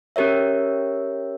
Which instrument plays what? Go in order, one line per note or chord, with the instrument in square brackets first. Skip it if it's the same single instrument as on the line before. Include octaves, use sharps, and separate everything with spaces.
[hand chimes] C#4 G4 A#4 C#5 E5